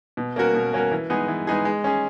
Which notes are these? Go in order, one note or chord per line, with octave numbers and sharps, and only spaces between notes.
B2
A#3 C#4 F#4 A#4
B2
A#3 C#4 F#4 A#4
E3
G#3 B3 D#4 G#4
E3
G#3 B3 D#4 G#4
G#3
C#4 G#4